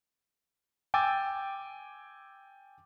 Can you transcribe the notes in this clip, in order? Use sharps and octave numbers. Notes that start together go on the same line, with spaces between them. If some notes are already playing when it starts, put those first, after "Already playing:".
G5 G#5 D6 E6 A6